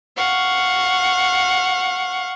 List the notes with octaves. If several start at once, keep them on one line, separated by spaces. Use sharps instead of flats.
F5 F#5 C#6